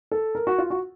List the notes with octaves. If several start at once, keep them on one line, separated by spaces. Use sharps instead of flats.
A4
A#4
F#4
F4
F#4